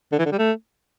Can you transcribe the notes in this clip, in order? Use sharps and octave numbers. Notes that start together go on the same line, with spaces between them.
D3
E3
D3
G3
A3